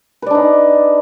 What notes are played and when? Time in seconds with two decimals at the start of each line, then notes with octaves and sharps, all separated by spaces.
0.22 B4
0.26 D5
0.31 D4
0.35 D#4